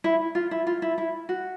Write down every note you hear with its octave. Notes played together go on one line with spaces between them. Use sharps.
E4
F4
E4
F4
E4
E4
F#4